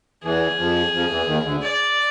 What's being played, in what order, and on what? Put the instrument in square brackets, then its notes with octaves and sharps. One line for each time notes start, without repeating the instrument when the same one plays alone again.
[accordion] E2 E3 [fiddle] G#4
[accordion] F2 F3
F2 F3
E2 E3
D#2 D#3
D2 D3
[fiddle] D5